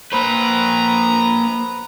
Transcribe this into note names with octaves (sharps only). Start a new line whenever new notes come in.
A#3 B4 C5 A#5